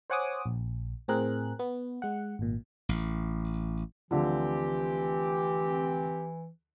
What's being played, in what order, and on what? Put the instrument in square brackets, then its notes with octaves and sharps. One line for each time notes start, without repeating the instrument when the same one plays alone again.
[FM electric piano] C5 C#5 F#5 G#5 D6 D#6
A#1
A2 C4 G#4 A#4 F#6
B3
G#3 F#5
G#1 A#2
[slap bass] A1
[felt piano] D2 D3 F3 [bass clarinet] E3 [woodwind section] C4 G4